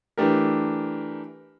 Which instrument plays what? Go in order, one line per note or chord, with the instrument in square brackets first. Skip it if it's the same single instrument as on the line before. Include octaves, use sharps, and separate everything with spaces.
[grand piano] E3 A3 D4 G4 A#4